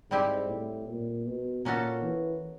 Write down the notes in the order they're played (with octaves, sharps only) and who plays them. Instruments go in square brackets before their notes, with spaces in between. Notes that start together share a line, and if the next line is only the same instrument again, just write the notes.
[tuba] G#2 [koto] G3 C4 E4 G4
[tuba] A2
A#2
B2
[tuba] A#2 [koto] A#3 C#4 F#4 A4
[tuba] E3